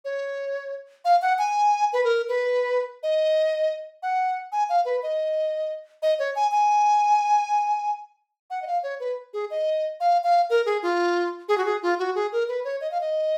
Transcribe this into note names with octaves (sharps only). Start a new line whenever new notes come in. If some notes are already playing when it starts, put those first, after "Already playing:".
C#5
F5
F#5
G#5
B4
A#4
B4
D#5
F#5
G#5
F5
B4
D#5
D#5
C#5
G#5
G#5
F#5
D#5
F5
C#5
B4
G#4
D#5
F5
F5
A#4
G#4
F4
G#4
F#4
G#4
F4
F#4
G#4
A#4
B4
C#5
D#5
F5
D#5